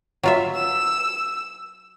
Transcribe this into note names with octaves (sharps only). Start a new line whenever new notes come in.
F#3 F4 E5
E6